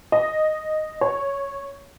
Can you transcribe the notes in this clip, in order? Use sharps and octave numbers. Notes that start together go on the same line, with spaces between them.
D#5
C#5